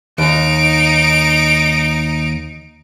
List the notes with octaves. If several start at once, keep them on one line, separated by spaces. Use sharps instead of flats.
D#2 D#4 D7